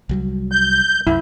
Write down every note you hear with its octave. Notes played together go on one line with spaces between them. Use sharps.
C2 F#3 G3
G6
C2 F#2 E4